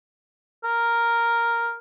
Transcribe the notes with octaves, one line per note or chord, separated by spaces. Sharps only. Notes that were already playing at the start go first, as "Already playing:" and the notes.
A#4